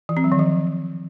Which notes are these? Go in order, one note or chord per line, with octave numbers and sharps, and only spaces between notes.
E3
C4
F#3
D#3
F3